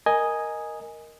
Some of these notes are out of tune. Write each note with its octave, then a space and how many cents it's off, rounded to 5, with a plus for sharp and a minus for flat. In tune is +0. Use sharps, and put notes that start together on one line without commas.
A#4 +0 D#5 +0 G#5 +0